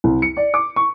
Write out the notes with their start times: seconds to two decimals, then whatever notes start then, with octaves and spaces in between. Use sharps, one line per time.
0.04 C2
0.22 C#7
0.37 D5
0.54 D6
0.76 C#6